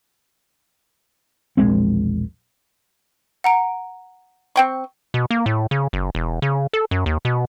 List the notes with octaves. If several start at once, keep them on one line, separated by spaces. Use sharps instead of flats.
E1 A#1 G#3 C4
F#5 A#5 D7
C4 G5 C#6
B2
A#3
A2
C#3
F#1
E1
C#3
A4
F#2
D#2
B2